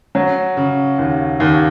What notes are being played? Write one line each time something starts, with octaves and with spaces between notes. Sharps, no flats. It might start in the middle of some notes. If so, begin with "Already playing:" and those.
F#3
C#3
D#2
D#2